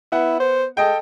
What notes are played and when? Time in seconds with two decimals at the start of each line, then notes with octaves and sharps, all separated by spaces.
0.12 B3 E4 F#5
0.40 C5
0.77 G#3 A4 D#5 G5